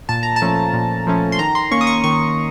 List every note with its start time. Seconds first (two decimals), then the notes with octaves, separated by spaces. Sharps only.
0.09 A#2 A5
0.23 A#5
0.36 A5
0.42 F3 A3 C#4
0.73 A#2
1.07 F3 A3 C#4
1.32 C6
1.39 D#3 A#5
1.55 C6
1.71 A#3 C#4 C#6
1.81 D#6
1.87 C#6
2.04 D#3 C#6